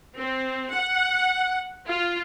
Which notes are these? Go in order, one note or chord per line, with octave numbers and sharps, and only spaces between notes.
C4
F#5
F4